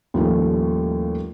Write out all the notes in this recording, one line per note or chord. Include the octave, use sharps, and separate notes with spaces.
D#2 A2 F3 G3 A3 C#4